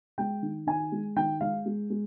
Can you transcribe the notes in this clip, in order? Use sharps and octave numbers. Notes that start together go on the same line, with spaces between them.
G#3 G5
D#3
D#3 G#5
G#3
D#3 G5
G#3 F5
G#3
G#3